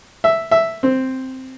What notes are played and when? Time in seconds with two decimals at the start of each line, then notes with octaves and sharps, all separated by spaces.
0.24 E5
0.51 E5
0.83 C4